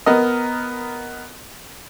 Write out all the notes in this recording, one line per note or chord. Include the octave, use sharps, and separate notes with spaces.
B3 A#4 D#5